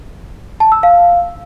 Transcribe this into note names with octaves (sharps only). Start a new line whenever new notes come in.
A5
E6
F5